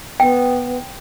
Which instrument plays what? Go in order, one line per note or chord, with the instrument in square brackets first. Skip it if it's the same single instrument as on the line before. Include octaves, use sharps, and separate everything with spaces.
[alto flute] B3 [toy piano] G5